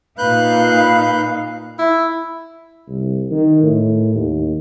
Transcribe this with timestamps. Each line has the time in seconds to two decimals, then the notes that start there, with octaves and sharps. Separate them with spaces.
0.18 A#2 D#4 B4 F5 F#6 G6
1.79 E4
2.88 C2
3.31 D#3
3.63 A2
4.15 D#2